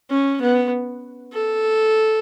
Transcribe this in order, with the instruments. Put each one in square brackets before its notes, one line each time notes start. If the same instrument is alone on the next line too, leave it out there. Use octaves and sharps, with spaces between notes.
[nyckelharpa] C#4
B3
A4